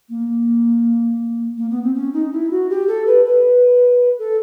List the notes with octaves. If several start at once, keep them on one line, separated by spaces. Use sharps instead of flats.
A#3
A#3
B3
C4
C#4
D#4
E4
F#4
G4
A4
B4
B4
A4